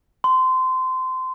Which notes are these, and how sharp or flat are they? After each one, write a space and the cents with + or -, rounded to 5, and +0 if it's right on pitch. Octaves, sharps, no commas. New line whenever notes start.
C6 -20